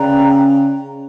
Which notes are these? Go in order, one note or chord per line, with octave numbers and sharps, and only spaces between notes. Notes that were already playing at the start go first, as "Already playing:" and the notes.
Already playing: C#3 B4 D5 G5 A#5